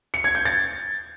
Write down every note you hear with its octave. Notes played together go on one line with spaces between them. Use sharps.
C#7
G#6
G6
A6